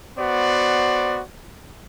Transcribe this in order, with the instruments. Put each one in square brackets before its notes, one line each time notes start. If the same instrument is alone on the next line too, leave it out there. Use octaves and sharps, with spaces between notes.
[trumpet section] B3 F#4 C5 D5